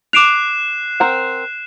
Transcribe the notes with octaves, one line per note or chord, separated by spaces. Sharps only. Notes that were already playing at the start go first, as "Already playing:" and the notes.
D6 F#6 C7 D7 E7 F7
C4 A#4 F#5